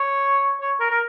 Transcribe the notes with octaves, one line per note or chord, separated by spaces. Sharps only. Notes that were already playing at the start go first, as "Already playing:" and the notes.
Already playing: C#5
C#5
A#4
A#4